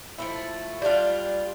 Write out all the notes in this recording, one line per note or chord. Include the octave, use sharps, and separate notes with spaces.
F3 A3 E4
G3 D4 F4